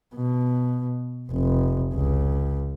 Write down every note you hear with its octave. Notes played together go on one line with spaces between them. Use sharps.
B2
F1
C#2